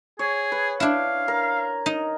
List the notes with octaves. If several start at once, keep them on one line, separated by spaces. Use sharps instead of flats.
G#4 C#5
B4
D4 E4 F5
A#4
D#4